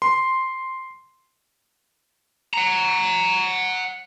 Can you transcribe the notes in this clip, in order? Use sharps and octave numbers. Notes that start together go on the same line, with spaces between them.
C6
F#5 A#5